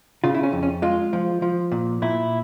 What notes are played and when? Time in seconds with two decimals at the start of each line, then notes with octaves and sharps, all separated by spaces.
0.24 C#3 F4
0.34 E4
0.43 C#4
0.53 F2
0.63 C#4
0.82 G#3 F4
1.13 F3
1.42 F3
1.72 A#2
2.02 A#2 E4